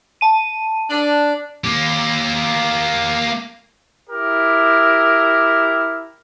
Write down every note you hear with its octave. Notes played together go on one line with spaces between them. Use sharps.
A5 D#7
D4
A#3 G4
E4 G4 A#4